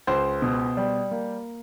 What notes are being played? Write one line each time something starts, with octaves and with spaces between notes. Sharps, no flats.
C#2 C5
B2
G3
A#3